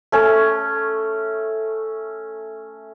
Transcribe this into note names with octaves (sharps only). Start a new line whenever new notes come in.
A3 C#4 A4